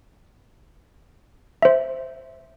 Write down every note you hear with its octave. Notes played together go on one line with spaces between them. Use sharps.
C5 E5